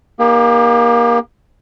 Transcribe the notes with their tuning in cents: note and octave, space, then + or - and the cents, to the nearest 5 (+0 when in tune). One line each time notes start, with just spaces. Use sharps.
A#3 +25 D#4 +0 G4 +45